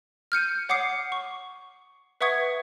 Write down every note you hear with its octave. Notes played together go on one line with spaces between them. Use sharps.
F6 G6 C#7 D#7
C#5 F#5 D6 D#6 C7
C#6
B4 E5 F#5 C#6 D#6 G#6